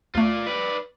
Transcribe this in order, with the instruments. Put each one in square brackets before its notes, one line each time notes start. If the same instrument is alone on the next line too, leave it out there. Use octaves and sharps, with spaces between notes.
[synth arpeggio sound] D2 A3 [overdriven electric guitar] F4 D5
[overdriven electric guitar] B4 D5